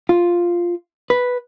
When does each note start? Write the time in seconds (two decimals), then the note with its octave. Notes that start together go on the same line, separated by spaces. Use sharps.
0.09 F4
1.10 B4